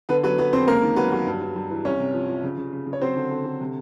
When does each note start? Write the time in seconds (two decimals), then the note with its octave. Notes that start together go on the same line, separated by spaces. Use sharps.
0.09 D3 B3 B4
0.23 F#3 B3 B4
0.38 F#3 B3 B4
0.53 F2 C4 C5
0.68 C#2 A#3 A#4
0.82 D#3
0.96 F#3 B3 B4
1.12 F#3
1.27 G2
1.41 G2
1.56 G2
1.70 E3
1.85 C2 C#4 C#5
2.00 C3
2.14 F3
2.28 F3
2.43 C#3
2.58 C#3
2.73 C#3
2.87 C#3
2.93 C#5
3.01 F#3 C4 C5
3.16 D3
3.31 D3
3.45 D3
3.61 C3